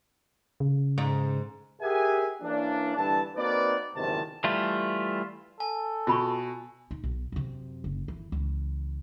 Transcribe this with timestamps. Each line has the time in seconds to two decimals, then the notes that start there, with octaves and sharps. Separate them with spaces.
0.60 C#3
0.98 G#2
1.80 G4 G#4 A#4 E5 F#5 G#5
2.41 E3 A#3 C#4 D4
2.96 G2 D3 E3 A5
3.35 A#3 C4 D#4 F#4 B4 D5
3.95 F#1 E2 G#2 C3 D#3 A5
4.44 E3 G3 A3 F4
5.60 A4 G#5
6.07 B2 F4 B5 C#6
6.91 D#4
7.04 B1
7.32 F#2 C3
7.84 F#1
8.08 E3
8.32 C#2 E3